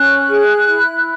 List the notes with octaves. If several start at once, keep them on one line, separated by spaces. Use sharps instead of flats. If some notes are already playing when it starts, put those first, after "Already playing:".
Already playing: C#4 F#6
G#4
E4